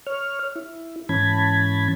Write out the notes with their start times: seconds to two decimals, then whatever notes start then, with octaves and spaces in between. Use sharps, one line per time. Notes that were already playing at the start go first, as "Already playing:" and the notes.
0.07 C#5 F6
0.56 E4
1.09 G#2 E3 C#4 A5 B5 G#6